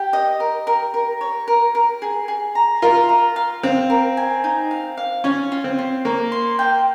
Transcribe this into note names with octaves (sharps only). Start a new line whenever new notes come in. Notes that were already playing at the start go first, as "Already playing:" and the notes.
Already playing: G4 G5
D#5
A#4
A#4
A#4
C#5
A#4
A#4
G#4
G#4
A#5
F4 A#4
A#5
F5
C4 F5
A#4
G#5
D#4
F5
F5
C#4 F4
F4
C4
F4
A#3 C#5
C6
G5